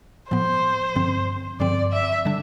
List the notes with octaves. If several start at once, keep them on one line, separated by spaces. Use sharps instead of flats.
A2 F3 B3 C5
G2 D3 F3 C4
G2 D3 F3 C4 D5
E5
D3 G3 D4